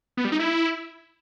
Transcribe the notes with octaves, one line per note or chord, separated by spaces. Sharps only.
B3
G3
D#4
E4